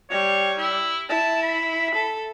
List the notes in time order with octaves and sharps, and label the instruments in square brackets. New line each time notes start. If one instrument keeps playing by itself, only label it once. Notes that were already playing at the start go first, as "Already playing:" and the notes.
[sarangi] G3 [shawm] C#5
[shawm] E4
[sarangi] E4 [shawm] A5
[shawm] B5
[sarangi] A4